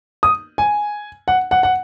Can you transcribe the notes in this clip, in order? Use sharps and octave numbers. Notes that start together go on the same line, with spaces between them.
D#6
G#5
F#5
F#5
F#5